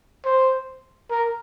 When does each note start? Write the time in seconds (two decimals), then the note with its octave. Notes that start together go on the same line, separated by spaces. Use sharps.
0.25 C5
1.10 A#4